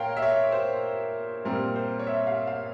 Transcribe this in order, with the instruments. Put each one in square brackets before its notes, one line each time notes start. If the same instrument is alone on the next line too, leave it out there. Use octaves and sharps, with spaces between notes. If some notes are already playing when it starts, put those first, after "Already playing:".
Already playing: [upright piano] A#2 A#4 C#5 F5 G5
E5
C#5
C5
A#2 G3 C4 A#4
C5
C#5
E5
F5
F5